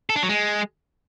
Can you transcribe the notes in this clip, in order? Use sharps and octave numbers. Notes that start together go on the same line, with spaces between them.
A4
D4
F#3
G#3